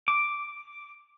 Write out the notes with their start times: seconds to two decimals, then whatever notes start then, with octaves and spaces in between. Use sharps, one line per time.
0.08 D6